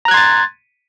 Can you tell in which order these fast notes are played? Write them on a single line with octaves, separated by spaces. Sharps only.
A#5 F#6 G#6 C6 A6